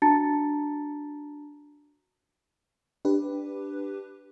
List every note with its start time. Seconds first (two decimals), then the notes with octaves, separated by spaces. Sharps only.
0.02 D4 F#4 A5 A#5 A6 C#7
3.05 D4 G4 B4